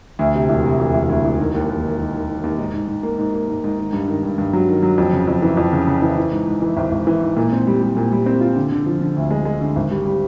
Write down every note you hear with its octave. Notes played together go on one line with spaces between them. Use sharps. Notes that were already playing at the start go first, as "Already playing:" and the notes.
D2
C3
E1
C3
E1
E1
D2
E1
D#3
D#2
D#2
D#3
D#3
D#3
D#3
D#2
G#2
G#2
G#2
A#3
G#2
A#3
G#2
G#2
D#3
G2
D#3
G2
G2
F#3
D#3
F#3
F2
C#3
F2
E3
F2
C#3
C#3
E3
E3
G#2
G#2
E3
G#1
G#1
E3
G#2
A#2
C4
G3
G3
A#2
G3
C4
F4
D3
D3
F3
D3
D2
G#3
G#3
D3
G#1
G3
G3